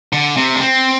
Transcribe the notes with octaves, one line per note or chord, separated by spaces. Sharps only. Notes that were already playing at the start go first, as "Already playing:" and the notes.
D3
C3
D4
C4